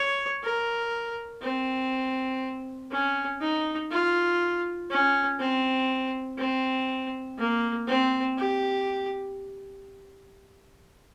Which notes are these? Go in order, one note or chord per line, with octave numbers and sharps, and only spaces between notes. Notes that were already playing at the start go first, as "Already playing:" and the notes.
Already playing: C#5
A#4
C4
C#4
D#4
F4
C#4
C4
C4
A#3
C4
G4